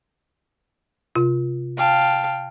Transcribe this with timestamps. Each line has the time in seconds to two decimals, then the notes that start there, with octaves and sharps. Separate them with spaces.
1.16 C3 F4
1.77 F5 G5 A5